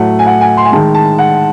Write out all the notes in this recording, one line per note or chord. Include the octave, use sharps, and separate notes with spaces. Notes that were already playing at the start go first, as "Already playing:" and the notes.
Already playing: A2 F#3 A3 F#5
G#5
F#5
G#5
C6
G#5
D#3 G#3 A5
A5
F#5